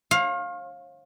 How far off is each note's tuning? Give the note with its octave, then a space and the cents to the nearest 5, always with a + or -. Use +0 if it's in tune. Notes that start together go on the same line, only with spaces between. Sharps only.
C#5 -45 F5 +15